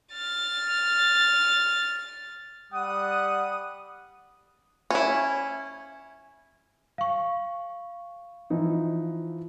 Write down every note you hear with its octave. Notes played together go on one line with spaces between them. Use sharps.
F6 A6
G3 F#5 D#6
C#4 E4
F5 C#6
E3 F3 D#4